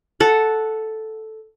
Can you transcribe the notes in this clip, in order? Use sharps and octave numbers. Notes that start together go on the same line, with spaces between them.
A4 F#5